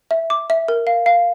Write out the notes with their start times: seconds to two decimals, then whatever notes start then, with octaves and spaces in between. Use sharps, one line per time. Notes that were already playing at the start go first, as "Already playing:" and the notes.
0.11 E5
0.30 D6
0.50 E5
0.68 A#4
0.87 F5
1.06 F5